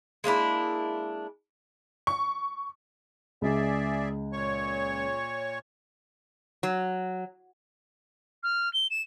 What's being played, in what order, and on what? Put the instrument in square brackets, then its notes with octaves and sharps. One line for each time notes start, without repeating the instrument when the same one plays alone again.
[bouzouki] G#3 A#3 D4 E4
[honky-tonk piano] C#6
[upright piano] C#2 [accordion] G#4 D5 E5
[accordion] A#2 C#5 C#6
[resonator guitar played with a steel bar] F#3
[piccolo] F6
G7
E7